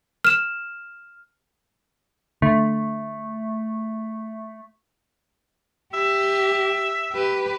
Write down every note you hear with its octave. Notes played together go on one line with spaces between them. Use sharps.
F6 E7
D3 A3
G4 E5
G4 B4